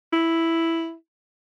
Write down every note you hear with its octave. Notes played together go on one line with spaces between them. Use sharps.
E4